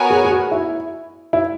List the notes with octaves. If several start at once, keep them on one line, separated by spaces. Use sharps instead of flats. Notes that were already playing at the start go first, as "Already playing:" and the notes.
Already playing: B3 F#4 A#4 C#5 G#5
G#4
G#4
F#4
E4
E4